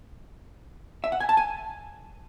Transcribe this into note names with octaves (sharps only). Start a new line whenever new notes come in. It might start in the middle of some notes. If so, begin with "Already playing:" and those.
E5
F#5
G#5
A5
G#5